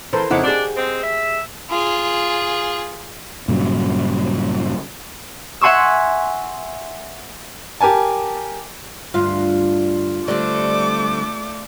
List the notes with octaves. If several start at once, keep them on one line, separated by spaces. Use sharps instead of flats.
E3 A4 A#4 C5
F2 C#3 D#4 E4 F#5 D6
D4 G4 G#4
G#3 C4
E5
F4 G#4
G2 A#2 C#3 F#3
E5 F#5 G#5 C6 C#6 E6
G4 A#4 G#5 A5
D2 G2 F4 F5
D3 G3 A3 C4 D5 D6